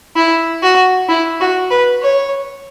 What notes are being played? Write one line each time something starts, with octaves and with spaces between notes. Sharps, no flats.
E4
F#4
E4
F#4
B4
C#5